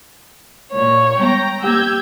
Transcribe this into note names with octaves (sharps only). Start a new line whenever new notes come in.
A#2 C#5
G3 G#3 B3 G5 A#5
A3 A#3 G4 E6 G6 G#6 A#6